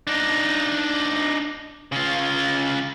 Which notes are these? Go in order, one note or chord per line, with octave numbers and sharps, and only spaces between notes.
D4 D#4
C#3 F4